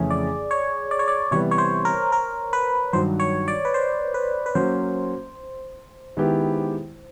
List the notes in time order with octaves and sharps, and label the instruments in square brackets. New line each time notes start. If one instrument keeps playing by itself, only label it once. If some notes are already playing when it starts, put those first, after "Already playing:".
Already playing: [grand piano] F2 C#3 E3 A3 C#4 [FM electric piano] G#4
[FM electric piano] D5
C#5
D5
C#5
D5
[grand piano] C3 E3 G3 B3 [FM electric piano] C#5
[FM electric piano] C#5
C5
A#4
A#4
B4
[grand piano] G2 D#3 F#3 [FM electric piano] C5
[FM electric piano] C#5
D5
B4
C5
B4
B4
[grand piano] F#3 A#3 C#4 [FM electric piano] C5
[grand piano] D#3 G#3 B3 E4 G4